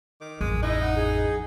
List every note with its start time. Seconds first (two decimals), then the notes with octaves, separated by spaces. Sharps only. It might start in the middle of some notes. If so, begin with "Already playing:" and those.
0.21 D#3 D6
0.41 A1 F2 G#3
0.63 D#4 E4 D#5
0.82 F#5
0.96 G#4